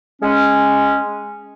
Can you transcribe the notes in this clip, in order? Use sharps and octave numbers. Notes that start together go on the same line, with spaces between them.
G#3 C#4